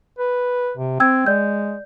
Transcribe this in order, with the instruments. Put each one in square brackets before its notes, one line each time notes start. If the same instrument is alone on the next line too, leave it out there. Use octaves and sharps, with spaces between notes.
[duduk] B4
C3
[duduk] C4 [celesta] G5 E6 G#6
[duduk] G#3 [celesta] D5 G6